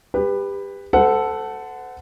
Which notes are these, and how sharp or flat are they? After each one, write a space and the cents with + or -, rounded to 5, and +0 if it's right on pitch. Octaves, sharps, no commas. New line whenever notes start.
G4 +25 B4 +0
A4 +0 C5 -40 F#5 +0